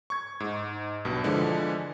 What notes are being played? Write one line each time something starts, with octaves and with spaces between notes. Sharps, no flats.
C#6 G#6
G#2
B1 G2 B2
D3 E3 F3 G#3 D4